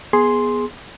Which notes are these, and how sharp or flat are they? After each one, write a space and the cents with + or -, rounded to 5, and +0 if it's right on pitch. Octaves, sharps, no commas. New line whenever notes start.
B3 -15 G#4 +0 C6 +0